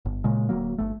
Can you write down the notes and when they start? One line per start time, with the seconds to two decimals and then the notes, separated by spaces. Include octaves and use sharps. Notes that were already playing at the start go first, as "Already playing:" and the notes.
0.05 G1
0.24 A#2 C#3 G#3
0.49 D1 D2 F#3 A#3
0.78 G1 A3